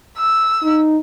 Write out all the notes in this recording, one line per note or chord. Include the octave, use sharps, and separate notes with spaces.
E6
D#4